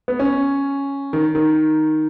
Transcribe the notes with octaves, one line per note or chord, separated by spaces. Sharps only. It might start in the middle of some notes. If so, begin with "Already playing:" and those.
B3
C#4
D#3
D#3